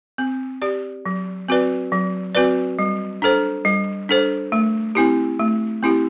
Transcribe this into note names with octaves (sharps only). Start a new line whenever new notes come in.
C4
G4 D5
F#3
C4 F#4 B4 D5
F#3
C4 F#4 B4 D5
G3
D4 A4 C5
G3
D4 A4 C5
A3
C4 E4 G4
A3
C4 E4 G4